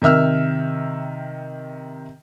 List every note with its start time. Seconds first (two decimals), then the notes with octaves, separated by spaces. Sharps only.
0.02 C3 D#3 E5 E6 F6